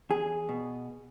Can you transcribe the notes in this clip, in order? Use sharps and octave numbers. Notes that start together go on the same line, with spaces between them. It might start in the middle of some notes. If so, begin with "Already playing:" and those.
E2 G#4
B2